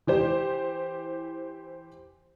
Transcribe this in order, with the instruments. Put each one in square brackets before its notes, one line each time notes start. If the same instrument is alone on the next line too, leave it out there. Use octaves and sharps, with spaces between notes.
[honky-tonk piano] E3 G4 C5